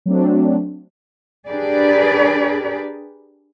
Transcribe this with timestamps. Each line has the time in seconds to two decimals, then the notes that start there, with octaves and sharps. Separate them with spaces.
0.06 F#3 A3 C4 D4
1.48 D4 G4 G#4 A#4 B4 D5